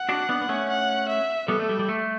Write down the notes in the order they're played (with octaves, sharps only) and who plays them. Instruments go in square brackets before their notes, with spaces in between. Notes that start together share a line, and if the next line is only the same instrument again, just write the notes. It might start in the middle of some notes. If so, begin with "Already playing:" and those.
Already playing: [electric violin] F#5
[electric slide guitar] D4 F#4
B3 D4
B3
A3 C#4
[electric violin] F#5
E5
[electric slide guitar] G3 B3 [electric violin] A4
[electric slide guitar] A3
G3
G3
A3